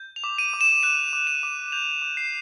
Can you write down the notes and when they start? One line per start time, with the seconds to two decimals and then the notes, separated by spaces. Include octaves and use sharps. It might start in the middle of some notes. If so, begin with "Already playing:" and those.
Already playing: G6
0.16 F7
0.24 D6
0.38 D#7
0.54 D6
0.61 E7
0.83 F#6 D#7
1.13 D6
1.27 E7
1.43 D6
1.72 G6 F7
2.02 D6
2.17 C7